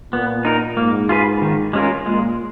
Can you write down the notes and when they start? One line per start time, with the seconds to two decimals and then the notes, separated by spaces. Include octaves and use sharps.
0.13 A#2 B3
0.45 D#4 A#4
0.77 G#2 A#3
1.09 F4 G#4 B4
1.42 D#3
1.73 G#3 C#4 F4 A#4
2.06 A#2 G#3